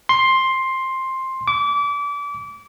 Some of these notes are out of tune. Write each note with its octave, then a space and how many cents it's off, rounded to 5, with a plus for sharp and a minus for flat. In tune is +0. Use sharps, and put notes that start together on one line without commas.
C6 +10
D6 -30